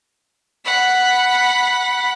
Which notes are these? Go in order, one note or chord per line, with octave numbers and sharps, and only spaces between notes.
F#5 B5